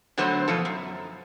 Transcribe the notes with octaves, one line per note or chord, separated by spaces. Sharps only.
D3 F#3 A3 B3 C5
B2 F3 A4
F#2